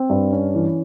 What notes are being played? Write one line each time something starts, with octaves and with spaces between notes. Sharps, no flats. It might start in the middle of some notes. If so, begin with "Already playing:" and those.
Already playing: C4
G2
C#4
E3